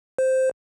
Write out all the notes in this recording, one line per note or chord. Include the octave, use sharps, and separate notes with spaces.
C5